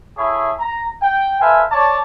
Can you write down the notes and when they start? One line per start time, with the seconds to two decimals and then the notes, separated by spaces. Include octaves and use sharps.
0.17 E4 G#4 A4 C#5 E5
0.60 A#5
1.02 G5
1.40 A4 B4 C5 E5 F5 G#5
1.71 C#5 D5 A5